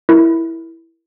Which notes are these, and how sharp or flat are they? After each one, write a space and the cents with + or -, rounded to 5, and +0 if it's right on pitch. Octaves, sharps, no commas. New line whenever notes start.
E4 +0 A#4 +0